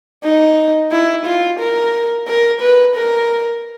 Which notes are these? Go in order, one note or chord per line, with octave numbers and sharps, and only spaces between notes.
D#4
E4
F4
A#4
A#4
B4
A#4